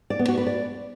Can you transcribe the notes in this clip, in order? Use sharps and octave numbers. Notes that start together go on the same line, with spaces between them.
D5
B3
F#4
B4
D5